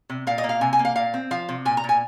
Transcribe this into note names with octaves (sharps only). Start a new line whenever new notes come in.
C3
A#2 F5
D#5
A#3
F5
C3 G#5
G#5
A#3
F5
A#2 F5
C4
F3 F5
C3
A#2 G#5
A#5
A#2
G#5